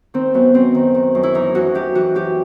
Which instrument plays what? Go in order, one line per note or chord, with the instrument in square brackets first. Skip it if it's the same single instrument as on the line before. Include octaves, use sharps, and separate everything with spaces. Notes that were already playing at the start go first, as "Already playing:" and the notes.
[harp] D#3 C4
F#2 B3
F#2 C4
D#3
D#3
F#2
E4
E3 D#4
F#2 F#4
F#2 G4
E3 F#4
F#2 G4